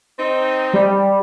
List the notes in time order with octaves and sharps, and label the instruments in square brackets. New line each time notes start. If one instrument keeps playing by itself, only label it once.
[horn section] C4 D#4
[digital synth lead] G3